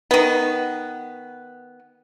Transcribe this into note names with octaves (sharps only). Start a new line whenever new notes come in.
D#3 B3